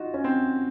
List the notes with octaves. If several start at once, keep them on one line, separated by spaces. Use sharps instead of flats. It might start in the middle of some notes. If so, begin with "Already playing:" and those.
Already playing: D#4 F4 F#4
C#4
C4